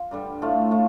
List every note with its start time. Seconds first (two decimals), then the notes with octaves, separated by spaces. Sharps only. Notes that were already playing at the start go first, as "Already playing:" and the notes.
Already playing: F4
0.11 G2 D3 G3
0.42 A2 A3 F4
0.71 A2 A3 F4